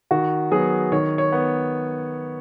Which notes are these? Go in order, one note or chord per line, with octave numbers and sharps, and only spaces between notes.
D#3 F#4
F#3 B3 G#4
D#3 C#5
C#5
B3